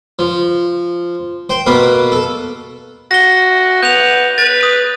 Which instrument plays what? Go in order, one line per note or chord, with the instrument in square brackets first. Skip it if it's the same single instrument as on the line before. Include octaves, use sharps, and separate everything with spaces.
[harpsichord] F3
C5 G5
B2 A#3 B4 F5
A4
[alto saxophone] F#4 [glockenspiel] A#6 G7
[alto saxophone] B3 [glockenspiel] G6 F7
[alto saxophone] B4 [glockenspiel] A6
[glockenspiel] D#6